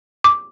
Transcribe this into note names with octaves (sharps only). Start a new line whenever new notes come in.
D6